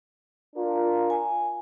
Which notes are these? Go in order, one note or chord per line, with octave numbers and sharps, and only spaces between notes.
D4 F4 A#4
G#5